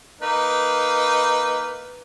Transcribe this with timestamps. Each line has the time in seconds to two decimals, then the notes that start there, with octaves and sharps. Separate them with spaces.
0.22 A#3 D#4 B4